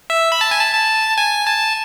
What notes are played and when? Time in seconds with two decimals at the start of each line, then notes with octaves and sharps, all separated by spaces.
0.10 E5
0.32 B5
0.41 A5
0.51 G#5
0.61 A5
0.74 A5
1.18 G#5
1.47 A5